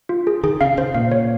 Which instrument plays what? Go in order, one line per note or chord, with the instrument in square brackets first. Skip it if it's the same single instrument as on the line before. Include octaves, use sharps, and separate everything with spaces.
[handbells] F4
G#4
[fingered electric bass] D#3 [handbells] G#4
[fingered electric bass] C#3 [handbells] F5
[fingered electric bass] C#3 [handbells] C5
[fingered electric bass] A#2 [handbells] F5
[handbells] C#5